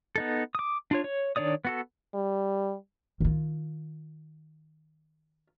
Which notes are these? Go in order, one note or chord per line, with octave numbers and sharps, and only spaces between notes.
B3 D#4 A4
D6 D#6
D4 F4 C#5
C#5
D#3 D4 C#5 D5 D#6
B3 F#4 A4
G3
D#3 F4